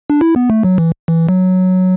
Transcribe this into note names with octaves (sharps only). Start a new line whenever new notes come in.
D4
E4
B3
A3
F#3
E3
E3
F#3